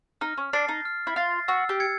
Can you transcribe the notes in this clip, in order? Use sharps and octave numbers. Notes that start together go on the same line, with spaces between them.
D#4 F6
C#4
D4 A6 C7
D#4
F6
E4
F4 A6 C7
F#4 E6
G4
G#6 C#7